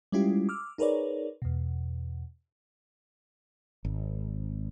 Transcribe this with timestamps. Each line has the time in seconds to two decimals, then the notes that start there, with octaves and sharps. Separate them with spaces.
0.12 G3 G#3 C#4 E4 F4 G4
0.49 D6 E6 F6
0.78 D#4 G#4 A#4 B4 C#5 D5
1.42 E2 B2
3.85 G#1